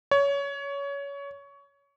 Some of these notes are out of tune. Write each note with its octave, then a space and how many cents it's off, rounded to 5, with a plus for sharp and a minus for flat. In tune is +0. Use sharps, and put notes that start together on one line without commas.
C#5 +20